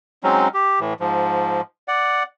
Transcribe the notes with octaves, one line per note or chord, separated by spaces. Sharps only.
F#3 G#3 C4 C#4 D#4
G4
A2 E3
G#2 F3
D5 F#5